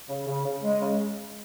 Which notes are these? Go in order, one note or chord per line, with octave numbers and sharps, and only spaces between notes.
C#3
C#3
C#3
G#3
C#3